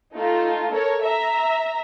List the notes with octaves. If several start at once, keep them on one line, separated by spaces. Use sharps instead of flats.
A3 D#4 F4
A4 A#4 C#5
E5 A#5